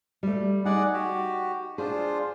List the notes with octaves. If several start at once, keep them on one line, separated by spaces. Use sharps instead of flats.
G3 A3
D#4 G#4 D5 F#5
F#4 G4
D4 F4 G#4 C5